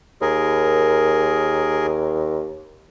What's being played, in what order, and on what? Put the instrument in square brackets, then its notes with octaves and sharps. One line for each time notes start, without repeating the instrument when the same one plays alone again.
[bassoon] D#2 [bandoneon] G#4 A#4